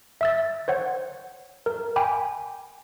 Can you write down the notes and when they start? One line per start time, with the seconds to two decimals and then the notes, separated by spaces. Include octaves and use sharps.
0.21 E5 E6 A6
0.68 C5 C#5 F#5
1.66 A#4
1.96 G5 G#5 B5 D6